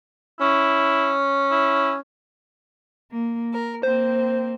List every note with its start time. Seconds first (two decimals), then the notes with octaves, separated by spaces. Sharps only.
0.41 C#4 E4
1.51 E4
3.12 A#3
3.53 A#4
3.83 A#3 C4 C5